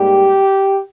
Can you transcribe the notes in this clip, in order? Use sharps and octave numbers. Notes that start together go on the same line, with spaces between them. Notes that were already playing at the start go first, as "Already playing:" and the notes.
Already playing: G#2 G3 A#3 G4